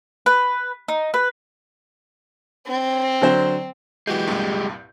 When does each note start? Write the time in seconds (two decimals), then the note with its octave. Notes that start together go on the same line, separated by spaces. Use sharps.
0.26 B4
0.88 D#4
1.14 B4
2.68 C4
3.22 D3 F#3 C5
4.07 E3 G#3 F#4 G4 G6
4.27 C2 G2 A#2